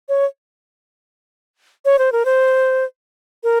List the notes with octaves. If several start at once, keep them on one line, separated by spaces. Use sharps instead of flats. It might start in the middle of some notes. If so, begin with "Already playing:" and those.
C#5
C#5
C5
A#4
C5
A#4